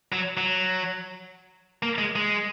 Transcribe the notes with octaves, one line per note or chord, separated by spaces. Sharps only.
F#3
F#3
A#3
G#3
G#3